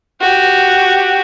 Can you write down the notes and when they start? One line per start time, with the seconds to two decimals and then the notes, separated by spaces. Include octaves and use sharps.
0.21 F#4 G4